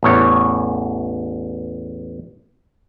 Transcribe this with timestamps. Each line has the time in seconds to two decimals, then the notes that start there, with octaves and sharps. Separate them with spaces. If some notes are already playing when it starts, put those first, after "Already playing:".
0.03 A1 E2 C#5